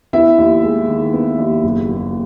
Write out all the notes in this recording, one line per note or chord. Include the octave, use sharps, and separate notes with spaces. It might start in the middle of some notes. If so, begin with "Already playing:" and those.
B3 E4 E5
D#2
G#3
D#3
B3
D#2
F#1
F#1